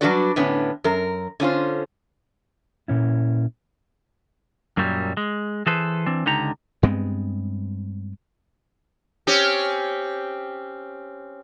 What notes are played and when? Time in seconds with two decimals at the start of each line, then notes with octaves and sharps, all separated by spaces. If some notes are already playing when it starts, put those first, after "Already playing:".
0.01 F#3 G3 D4 F#4 B4 D5
0.36 A2 D3 B3 C#4
0.84 F#2 A#4
1.40 D3 C#4 F4 C5
2.88 A#2 C#4 E4
4.77 F#2 A#2 F#3 G3
5.17 G#3
5.66 E3 G#4 A4 B4 C5
6.06 E3 C4 D4
6.26 C#2 D3 D#4 G4 A#5
6.83 G2 G#3 B3 C4
9.27 C4 C#4 G4